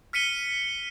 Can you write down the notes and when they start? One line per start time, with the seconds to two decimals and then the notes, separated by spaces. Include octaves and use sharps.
0.13 F6 B6 C#7 D#7 G7